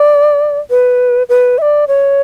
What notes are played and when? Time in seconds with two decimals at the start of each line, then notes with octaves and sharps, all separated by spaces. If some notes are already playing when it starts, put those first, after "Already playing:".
Already playing: D5
0.70 B4
1.29 B4
1.58 E5
1.62 D5
1.88 C#5